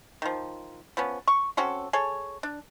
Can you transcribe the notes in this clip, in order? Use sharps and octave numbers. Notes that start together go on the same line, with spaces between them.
D#3 F3
F3 B3 C#4
C#6
C4 C#4 F#4 A4
G#4 A4 C#5
D4